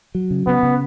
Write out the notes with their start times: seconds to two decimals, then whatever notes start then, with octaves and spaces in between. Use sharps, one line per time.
0.15 F#3
0.31 C#3
0.47 C#3 B3
0.63 C#3